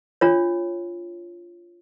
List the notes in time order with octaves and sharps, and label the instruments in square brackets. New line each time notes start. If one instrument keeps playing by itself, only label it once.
[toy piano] D4 F4 C#5